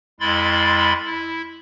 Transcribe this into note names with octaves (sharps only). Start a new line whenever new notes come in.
F2 G#3 E4 B5 C6 A6
E4